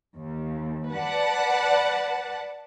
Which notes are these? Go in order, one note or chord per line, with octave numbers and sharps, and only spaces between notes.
D#2
B4 D5 F#5 A5